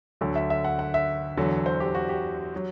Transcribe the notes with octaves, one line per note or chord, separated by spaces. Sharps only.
D2 D3 F#3 A4
E5
E5
F#5
F#5
E5
E2 D3 F#3
C5
G4
F#4
G4
F#3